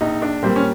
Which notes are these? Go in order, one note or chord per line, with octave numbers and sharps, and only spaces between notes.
A#1 D#4
D4
A#2 G3 A#3 C4
C#4